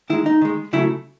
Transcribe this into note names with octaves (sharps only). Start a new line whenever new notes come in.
D#3 G#3 E4
D#4
D#3 G#3
C#3 F#3 A3 E4